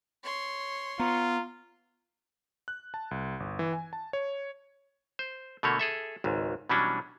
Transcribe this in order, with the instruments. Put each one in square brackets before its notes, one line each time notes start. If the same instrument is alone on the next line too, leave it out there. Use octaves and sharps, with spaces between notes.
[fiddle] C#5 C6
[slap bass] B3 [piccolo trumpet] F4 [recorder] A#5
[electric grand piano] F#6
A5
C2
G1
E3
G#5
A5
C#5
[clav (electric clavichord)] C5
B2 D3 A3 A#3 C#5
G#4 A4 E5
G#1 C#2 G#2
B2 E3 F#3 G3 C#4 D4